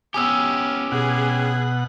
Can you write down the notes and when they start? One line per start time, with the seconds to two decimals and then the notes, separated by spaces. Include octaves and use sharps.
0.14 B3 C#4 G4 G#5 D#6 E6
0.92 B2 G#4 F#5